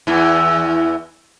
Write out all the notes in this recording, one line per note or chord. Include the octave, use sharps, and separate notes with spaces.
E2 E3